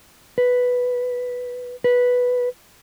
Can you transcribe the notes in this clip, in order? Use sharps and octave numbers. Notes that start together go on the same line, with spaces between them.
B4
B4